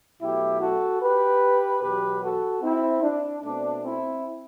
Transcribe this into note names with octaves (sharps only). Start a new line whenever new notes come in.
B2 F#3 A3 E4 G4
F#4 A4
G4 B4
E2 B2 F#3 G4 B4
F#4 A4
C4 E4
D4
B2 A3 C4 D4
C4 E4